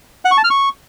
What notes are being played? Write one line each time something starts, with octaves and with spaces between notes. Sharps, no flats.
F#5
C#6
A5
F6
C#6